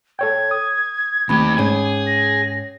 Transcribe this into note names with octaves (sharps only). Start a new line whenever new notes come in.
A4 C#5 G5 G#6
D#6
D#2 A3 C4 G4 B5
G#2 C#4 G#4 C#5
A#6